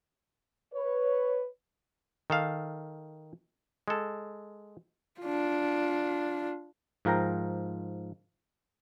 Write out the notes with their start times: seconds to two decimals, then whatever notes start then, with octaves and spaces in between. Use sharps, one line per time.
0.73 B4 C#5
2.30 D#3 A4 F5
3.88 G#3 A4
5.21 D4 F4
7.05 G#2 F3 A#4 G5 A#5